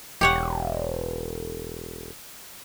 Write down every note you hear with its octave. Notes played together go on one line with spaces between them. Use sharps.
E1 G4 C#5 F#5